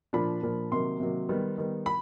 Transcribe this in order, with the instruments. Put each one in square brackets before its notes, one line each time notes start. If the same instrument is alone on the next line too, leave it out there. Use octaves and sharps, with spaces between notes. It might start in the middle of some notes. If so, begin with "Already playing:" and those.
[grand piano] A#2 F3 A#3 D4 B5
A#2 F3 A#3 D4
C3 D#3 F#3 A#3 C6
C3 D#3 F#3 A#3
D#3 G3 B3
D#3 G3 B3
B5